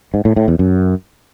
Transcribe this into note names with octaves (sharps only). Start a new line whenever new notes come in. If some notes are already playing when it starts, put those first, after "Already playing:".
G#2
A2
A2
E2
F#2